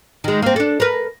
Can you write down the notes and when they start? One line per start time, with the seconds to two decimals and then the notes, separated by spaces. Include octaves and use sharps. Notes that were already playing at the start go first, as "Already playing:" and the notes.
0.24 D#3 G#3
0.42 A#3 C4
0.56 D4 A4
0.80 A#4 B4